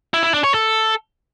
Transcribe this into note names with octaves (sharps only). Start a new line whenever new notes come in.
E4
E4
D4
C#5
A4